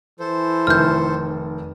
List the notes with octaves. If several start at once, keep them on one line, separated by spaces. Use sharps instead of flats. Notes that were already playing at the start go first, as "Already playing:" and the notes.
E3 A4 C5
F1 D#3 F6 G6